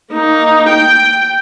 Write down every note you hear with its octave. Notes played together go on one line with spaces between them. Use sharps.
A#3 D#4
G5